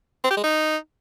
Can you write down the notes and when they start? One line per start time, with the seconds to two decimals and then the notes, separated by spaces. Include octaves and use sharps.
0.24 C4
0.30 G4
0.37 G#3
0.44 D#4